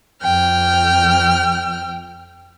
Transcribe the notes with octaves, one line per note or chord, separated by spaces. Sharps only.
F2 G5 F6